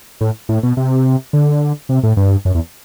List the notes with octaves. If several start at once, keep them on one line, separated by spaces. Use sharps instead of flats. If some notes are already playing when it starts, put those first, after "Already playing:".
A2
A2
B2
C3
D3
C3
A2
G2
F#2
E2